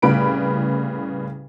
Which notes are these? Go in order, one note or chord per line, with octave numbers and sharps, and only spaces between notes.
C2 A2 C#3 B4 B5 D7